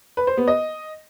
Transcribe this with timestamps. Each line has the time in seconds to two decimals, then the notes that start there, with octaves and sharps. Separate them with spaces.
0.17 B4
0.27 C5
0.37 B3
0.48 D#5